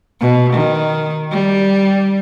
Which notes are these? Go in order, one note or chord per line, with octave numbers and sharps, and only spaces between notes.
B2
D#3
G3